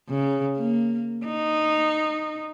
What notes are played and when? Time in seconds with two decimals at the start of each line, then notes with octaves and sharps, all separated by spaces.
0.10 C#3
0.56 A#3
1.26 D#4